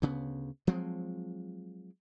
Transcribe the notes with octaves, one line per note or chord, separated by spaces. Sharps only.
D2 C#3 B3
F3 F#3 G#3 C4